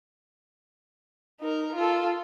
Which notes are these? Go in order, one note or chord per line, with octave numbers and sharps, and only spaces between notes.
D#4 A#4
F4 A4